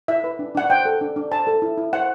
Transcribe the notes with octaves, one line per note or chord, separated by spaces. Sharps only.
E4 E5
B4
D4
D4 F#5
C5 G5
A4
D4
D4
C5 A5
A4
E4
E4
C5 F#5